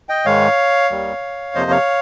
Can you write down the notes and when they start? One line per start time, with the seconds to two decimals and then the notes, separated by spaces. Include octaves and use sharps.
0.09 D#5 G5
0.25 G#2 D#3 G#3 C#5 F5
0.90 D#2 D#3 G3
1.55 F2 C3 F3 A#3 C5 D#5
1.71 C#5 F5